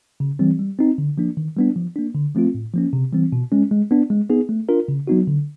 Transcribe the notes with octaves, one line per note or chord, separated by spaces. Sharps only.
C#3
E3 G3 C4
G3
C4 D#4
D3
F3 A#3 D4
D#3
G3 B3 D4
F3
A#3 D4
D3
F3 A3 C4 F4
A2
F3 A#3 C#4
C3
E3 G3 C4
B2
G#3 C#4
G#3
B3 D4
G#3
B3 D#4 G#4
A3
D4 F4 A#4
C#3
F#3 B3 D#4 F#4
D3